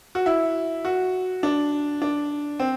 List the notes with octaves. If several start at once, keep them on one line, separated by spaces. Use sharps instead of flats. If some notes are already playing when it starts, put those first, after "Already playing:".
F#4
E4
F#4
D4
D4
C4